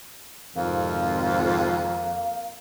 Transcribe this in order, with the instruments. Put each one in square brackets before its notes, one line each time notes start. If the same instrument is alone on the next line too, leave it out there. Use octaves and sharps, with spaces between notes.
[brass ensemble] G#1 C3 F4 [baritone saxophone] F2 [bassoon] A#3